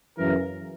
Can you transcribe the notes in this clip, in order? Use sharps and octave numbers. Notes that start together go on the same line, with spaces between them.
F#2 C#3 E3 A#4